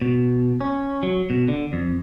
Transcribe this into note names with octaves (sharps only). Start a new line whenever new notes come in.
B2
C#4
F#3
B2
D3
F2